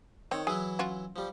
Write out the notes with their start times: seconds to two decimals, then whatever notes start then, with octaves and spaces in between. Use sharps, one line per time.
0.31 D#3 C4 C#5
0.47 E3 F#3 E4 G#4 G#5
0.79 C#4 F4 F#4
1.16 F3 G3